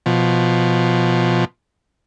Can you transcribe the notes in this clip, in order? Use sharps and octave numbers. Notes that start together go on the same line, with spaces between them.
B2 F3